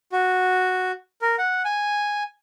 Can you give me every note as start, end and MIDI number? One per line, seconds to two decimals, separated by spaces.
0.12 0.92 66
1.22 1.36 70
1.38 1.63 78
1.65 2.23 80